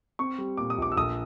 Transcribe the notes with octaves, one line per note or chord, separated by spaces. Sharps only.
C4 C#6
G3
A#2 D6
D#6
A#1 D6
E6
A#1 D#6